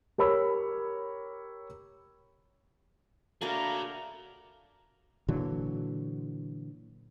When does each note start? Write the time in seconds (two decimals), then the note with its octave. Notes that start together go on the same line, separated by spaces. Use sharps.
0.18 G4 A#4 C#5 B5 E6
3.41 A3 A#3 D4 F#4 G#4 A4 F5 A#5
5.28 A#2 D3 E3 F#3